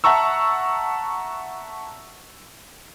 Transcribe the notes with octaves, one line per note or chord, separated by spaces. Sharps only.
E5 F#5 A5 A#5 C#6 E6